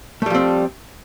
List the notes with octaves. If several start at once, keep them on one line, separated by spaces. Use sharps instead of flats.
F3 G3 A3 C4